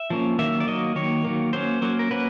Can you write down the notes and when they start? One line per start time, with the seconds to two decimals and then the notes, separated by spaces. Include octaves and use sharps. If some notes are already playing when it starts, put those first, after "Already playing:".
Already playing: E5
0.10 F3 A#3 C#4
0.39 D#3 F#3 A#3 E5
0.60 D5
0.67 D#3 F#3 A#3 D#5
0.96 D#3 F#3 A#3 C#5
1.25 D#3 F#3 A#3
1.53 F#3 A#3 C#4 C5
1.82 F#3 A#3 C#4
1.99 A#4
2.11 F#3 A#3 C#4 B4